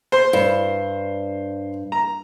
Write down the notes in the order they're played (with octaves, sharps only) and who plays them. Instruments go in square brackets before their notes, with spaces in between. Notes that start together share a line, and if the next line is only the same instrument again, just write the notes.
[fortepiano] C5 C6
[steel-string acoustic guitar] G2
[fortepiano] A#5